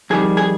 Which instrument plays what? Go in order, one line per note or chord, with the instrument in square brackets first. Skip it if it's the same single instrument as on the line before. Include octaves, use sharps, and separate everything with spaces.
[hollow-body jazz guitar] F2 D#3 G3 G#4
G#4